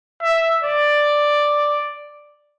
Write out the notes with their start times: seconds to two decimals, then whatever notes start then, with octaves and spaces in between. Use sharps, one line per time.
0.22 E5
0.63 D5